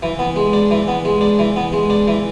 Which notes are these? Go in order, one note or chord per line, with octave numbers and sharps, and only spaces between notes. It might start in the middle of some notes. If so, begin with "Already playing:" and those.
E3
B3
G#3
D4
E3
B3
G#3
D4
E3
B3
G#3
D4
E3